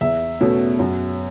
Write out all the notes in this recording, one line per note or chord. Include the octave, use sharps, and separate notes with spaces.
E2 E5
B2 A3 C#4
F#2